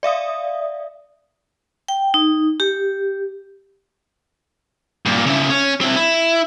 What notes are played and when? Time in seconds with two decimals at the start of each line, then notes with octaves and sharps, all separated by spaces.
0.03 D5 E5 F5 D#6
1.88 G5
2.14 D#4
2.60 G4
5.06 G2 A#2
5.26 C#3 E4
5.50 C#4
5.81 C4 E4
5.96 E4